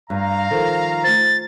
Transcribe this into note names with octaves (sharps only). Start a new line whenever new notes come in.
G2 F5 A#5
D#3 F3 A4 C5
A3 F4 C5 A6